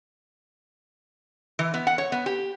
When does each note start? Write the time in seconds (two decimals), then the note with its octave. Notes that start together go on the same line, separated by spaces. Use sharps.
1.59 E3
1.74 B3
1.87 F#5
1.98 C#5
2.12 B3
2.26 G4